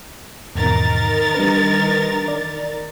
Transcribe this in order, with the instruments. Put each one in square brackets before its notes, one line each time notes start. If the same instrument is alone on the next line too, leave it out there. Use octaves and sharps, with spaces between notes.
[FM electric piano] E2 G#2 B2 [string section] D#3 A#4 A6
[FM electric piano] G3 D4 B4
D5